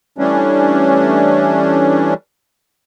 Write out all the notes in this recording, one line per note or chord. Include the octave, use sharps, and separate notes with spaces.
E3 G3 A3 C#4 D4